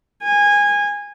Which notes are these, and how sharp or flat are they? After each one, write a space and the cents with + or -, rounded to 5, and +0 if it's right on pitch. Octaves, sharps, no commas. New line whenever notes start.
G#5 -20